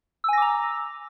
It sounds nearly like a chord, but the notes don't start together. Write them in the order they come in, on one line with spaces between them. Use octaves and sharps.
E6 G#5 A#6 D6 A#5